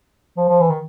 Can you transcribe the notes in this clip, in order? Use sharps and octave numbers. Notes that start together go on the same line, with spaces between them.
F3
F3
E3
D#3